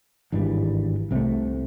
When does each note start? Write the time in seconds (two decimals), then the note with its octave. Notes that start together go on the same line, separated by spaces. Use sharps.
0.32 G#1 G2 E3 G3
1.11 C2 C3 E3
1.16 A3